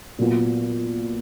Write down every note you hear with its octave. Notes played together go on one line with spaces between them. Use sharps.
A#2 F#3 B3 F4